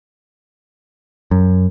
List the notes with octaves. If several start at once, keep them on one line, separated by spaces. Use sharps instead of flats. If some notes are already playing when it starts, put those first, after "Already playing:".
F#2